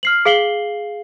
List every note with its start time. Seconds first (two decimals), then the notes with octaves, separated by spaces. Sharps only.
0.03 F6 C7 F#7
0.25 G#4 F5 C7 F#7 G7